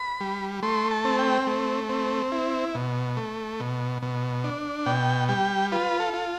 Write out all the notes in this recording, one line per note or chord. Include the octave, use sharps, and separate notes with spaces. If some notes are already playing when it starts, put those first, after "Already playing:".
Already playing: B5
G3
A3 C6
A5
C4
G5
A3
C4
E4
B2
A3
B2
B2
D4
B2 G5
G3 G5
F4 B4
A4
F4